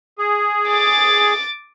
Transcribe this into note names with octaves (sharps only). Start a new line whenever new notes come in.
G#4
D6 A6